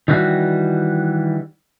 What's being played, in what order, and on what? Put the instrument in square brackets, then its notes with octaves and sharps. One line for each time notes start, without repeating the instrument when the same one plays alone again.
[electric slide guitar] D#3 E3 G3 F#4